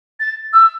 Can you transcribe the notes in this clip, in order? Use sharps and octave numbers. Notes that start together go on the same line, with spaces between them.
A6
E6